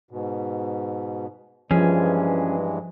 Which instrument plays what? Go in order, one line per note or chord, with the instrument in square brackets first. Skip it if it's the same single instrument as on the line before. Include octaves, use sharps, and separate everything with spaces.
[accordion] G#2 B2
[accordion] G2 E3 G#3 [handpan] F3 [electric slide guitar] C#4 G#4